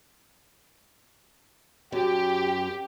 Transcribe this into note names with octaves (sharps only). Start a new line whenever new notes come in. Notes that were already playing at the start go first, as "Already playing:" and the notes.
F#2 G4